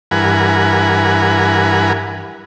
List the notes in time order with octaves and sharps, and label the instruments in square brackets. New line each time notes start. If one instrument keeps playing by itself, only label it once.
[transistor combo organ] G2 E3 A#4 F#5 G#5 B5